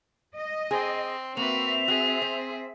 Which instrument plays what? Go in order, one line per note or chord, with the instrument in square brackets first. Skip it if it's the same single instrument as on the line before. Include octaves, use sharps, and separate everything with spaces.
[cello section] D#5
[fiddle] C4 [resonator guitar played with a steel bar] G#4
[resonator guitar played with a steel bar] A#3 [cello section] C4 E5 [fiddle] F#4 B4 [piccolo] F7
[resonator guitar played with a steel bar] F#4 [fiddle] G#4
[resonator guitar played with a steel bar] C5